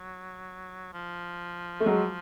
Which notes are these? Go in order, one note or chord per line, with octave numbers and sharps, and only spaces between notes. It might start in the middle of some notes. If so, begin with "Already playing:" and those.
Already playing: F#3
F3
A3
F#3 G#3